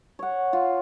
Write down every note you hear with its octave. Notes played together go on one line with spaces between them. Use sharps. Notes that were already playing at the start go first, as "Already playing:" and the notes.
C#5 F#5
F4